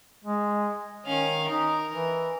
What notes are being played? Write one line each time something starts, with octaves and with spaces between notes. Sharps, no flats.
G#3
D#3 C#4 F5
D#4 A#4
E3